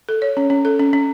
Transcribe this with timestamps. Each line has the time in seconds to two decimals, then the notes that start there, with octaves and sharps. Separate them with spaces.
0.09 A4
0.22 C#5
0.37 C#4
0.50 C#4
0.65 A4
0.79 C#4
0.93 C#4